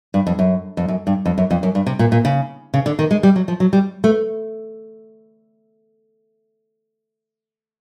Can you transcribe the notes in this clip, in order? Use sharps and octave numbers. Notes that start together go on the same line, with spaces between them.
G2
F2
F#2
F2
F#2
G2
F2
F#2
F2
F#2
G2
C3
A#2
A#2
C#3
C#3
D3
D#3
G#3
G3
F#3
F3
F#3
G3
A3